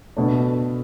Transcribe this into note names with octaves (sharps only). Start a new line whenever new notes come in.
B2 A3 D4